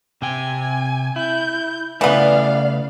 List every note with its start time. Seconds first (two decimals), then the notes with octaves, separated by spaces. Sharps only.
0.22 C3 G5 G#5
1.16 E4 G6
2.01 C#3 E3 A3 B3 D5 F5